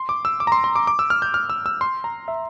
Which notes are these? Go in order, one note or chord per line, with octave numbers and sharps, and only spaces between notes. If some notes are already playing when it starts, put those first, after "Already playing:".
Already playing: C6
D6
E6
D6
A#5
C6
C6
D6
D6
E6
F6
G6
F6
E6
E6
C6
A#5
E5